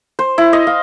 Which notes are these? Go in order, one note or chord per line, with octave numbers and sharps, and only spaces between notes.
C5
E4
D#5
F5